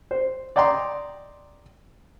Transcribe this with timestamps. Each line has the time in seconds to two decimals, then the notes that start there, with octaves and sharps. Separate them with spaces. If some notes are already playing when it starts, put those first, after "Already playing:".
0.11 C5
0.56 D5 D#5 G5 A#5 C6